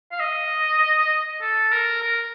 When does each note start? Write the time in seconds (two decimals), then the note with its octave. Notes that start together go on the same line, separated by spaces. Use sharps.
0.11 F5
0.20 D#5
1.42 A4
1.72 A#4
2.02 A#4